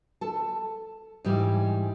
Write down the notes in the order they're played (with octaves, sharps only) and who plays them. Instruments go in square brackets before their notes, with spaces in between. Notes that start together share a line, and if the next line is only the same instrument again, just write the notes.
[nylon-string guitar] A4 A5
G#2 E3 G3